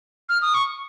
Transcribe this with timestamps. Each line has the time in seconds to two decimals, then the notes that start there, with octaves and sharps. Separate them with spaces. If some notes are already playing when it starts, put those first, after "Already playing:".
0.29 F6
0.42 D#6
0.54 C#6